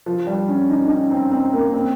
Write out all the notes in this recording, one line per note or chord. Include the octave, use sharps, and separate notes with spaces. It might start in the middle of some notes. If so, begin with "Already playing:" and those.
F3
G3
C#4
D#4
D#4
C#4
C4
C4
A#3
C4